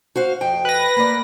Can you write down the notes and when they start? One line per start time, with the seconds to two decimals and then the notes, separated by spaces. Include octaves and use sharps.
0.16 F#4 C5 F5
0.41 F2 G5
0.65 B4 A#6
0.96 A#3 D5